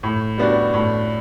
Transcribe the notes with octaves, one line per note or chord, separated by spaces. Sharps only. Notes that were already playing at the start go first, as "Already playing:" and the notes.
A2
G3 B3 D4 F#4
A2